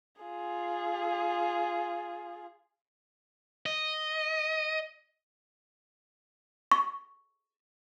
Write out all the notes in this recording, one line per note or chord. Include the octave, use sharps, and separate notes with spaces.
F4 G#4
D#5
C#6